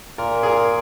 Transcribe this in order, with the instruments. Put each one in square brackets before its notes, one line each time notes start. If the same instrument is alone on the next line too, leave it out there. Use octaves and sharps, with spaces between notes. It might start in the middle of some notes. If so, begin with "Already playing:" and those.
[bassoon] A#2 [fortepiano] A#4
[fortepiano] G#4
A#4